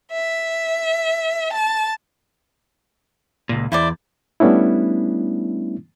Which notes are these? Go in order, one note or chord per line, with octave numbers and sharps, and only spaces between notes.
E5
A5
C#2 A#2
E2 E4 C5 D5
G3 A3 B3 C#4 D4 E4